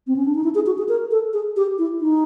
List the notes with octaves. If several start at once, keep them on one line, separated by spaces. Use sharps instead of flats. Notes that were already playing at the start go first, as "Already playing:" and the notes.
C4
C#4
D4
D#4
E4
G#4
F#4
G#4
A#4
A4
G#4
G4
E4
D#4